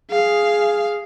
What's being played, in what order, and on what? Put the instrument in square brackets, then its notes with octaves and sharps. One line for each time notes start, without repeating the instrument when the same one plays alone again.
[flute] G#4 [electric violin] F5